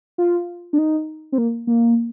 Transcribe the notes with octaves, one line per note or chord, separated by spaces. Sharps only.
F4
D4
D#4
C4
A#3
A#3